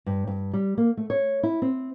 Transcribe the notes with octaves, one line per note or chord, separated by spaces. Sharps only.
G2
G2
G3
A#3
A3
C#5
E4
C4